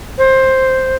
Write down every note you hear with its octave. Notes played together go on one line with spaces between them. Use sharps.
C5